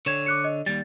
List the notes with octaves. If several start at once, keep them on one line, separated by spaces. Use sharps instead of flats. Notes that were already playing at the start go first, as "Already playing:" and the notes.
D3 C#5 G#6 E7
D6 F#6 C#7
D#5
D#2 G3 A6